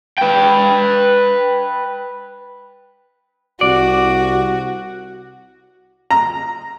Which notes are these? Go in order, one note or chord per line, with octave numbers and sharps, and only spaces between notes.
B4 G5
C2 F#4 D5
A#5